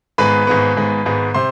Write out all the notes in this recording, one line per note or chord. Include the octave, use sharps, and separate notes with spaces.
G#1 G#2 G#3 B3 B4 B5
G#1 G#2 G#3 B3
G#1 G#2 G#3 B3
G#1 G#2 G#3 B3
C3 C5 C6